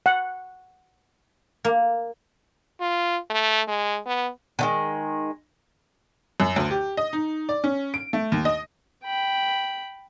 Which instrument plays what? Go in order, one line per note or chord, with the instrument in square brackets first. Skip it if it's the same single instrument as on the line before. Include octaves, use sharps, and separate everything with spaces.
[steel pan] F#5
[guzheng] A#3
[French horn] F4
A3
G#3
B3
[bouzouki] D3 D#3 G#3
[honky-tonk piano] F#2
D2
G4
D#5
D#4
D5
C#4
D7
A3
D#2
D#5
[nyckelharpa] G5 B5